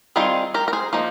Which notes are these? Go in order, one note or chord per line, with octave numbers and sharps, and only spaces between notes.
D#3 G3 C4 F4 G#4
G4 A#4
A#4
G#4 C5
F3 A#3 D#4